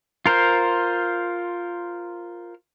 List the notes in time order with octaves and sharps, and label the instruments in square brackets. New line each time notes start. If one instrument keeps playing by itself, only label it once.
[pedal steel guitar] F4 A#4 C5